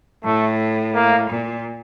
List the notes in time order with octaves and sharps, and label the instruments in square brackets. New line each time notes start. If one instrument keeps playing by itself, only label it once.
[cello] A2 [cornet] A3
[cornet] A#3
[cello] A#2